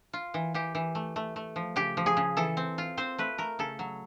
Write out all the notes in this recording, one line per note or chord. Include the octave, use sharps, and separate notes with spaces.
F4
E3
E3 G4
E3
A3
A3
A3
F3
C#3 G4
F3
G#4
C#3
E3 A4
C4
F4
C4 C5
A3 B4
A3 A#4
C#3 A4
F#3